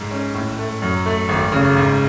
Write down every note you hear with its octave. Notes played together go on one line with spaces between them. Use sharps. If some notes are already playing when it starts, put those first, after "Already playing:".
Already playing: G#2
C#4
A2
A3
F#2
A3
G#1
C#3
G#2